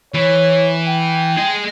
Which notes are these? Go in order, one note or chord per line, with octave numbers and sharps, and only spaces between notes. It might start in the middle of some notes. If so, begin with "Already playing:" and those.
E3 C#5
G5
G#4 D#5